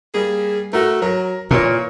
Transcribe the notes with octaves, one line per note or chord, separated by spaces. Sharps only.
G3 A#3 G#4
A3 F#4 A#4
F#3 A#4
A#2 E3 A#4 C#5